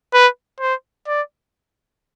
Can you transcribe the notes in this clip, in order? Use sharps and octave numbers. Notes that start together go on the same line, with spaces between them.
B4
C5
D5